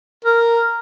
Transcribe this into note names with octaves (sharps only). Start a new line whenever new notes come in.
A#4